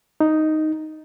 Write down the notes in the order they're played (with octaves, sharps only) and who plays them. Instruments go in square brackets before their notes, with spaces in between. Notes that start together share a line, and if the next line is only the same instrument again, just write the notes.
[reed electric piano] D#4